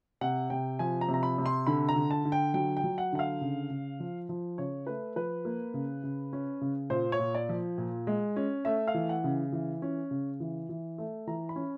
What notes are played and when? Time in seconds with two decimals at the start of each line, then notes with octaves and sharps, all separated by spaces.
0.21 C3 F#5
0.50 C3 G5
0.79 F3 G#5
1.01 A#5
1.08 C3
1.14 A#5
1.23 B5
1.38 C3
1.46 C6
1.67 D3 B5
1.89 A#5
1.96 D3
2.11 A5
2.25 D3
2.32 G5
2.54 F#3 G5
2.77 G5
2.84 F#3
2.98 F#5
3.13 D3 F#5
3.19 F5
3.41 C#3
3.70 C#3
4.00 F3
4.29 F3
4.58 C#3 C#5
4.87 A3 B4
5.16 F3 B4
5.45 A#3
5.74 C#3
6.03 C#3
6.33 C#4
6.61 C#3
6.90 A#2 C5
7.12 C#5
7.19 A#2
7.35 D5
7.49 F3
7.78 A#2
8.07 G#3
8.36 C#4
8.65 A3 E5
8.87 F5
8.94 E3
9.09 F#5
9.24 C#3
9.52 E3
9.82 C#4
10.11 C#3
10.40 E3
10.69 E3
10.98 A3
11.27 E3 A#5
11.49 B5
11.56 C#4